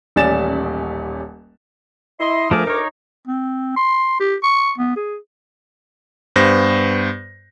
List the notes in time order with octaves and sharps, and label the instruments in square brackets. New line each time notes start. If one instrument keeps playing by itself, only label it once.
[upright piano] D#1 A1 C#4 D5 A6 E7
[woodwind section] E4 D#5 C6
[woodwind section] D2 A#4 D6 [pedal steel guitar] F3 A3 G#4
[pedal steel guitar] D#4 C#5
[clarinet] C4
C6
G4
C#6
B3
G#4
[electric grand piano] G2 B3 C5 A#6